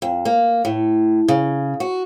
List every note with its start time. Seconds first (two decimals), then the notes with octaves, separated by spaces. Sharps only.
0.02 F2
0.25 A#3
0.65 A2
1.28 C#3
1.80 F#4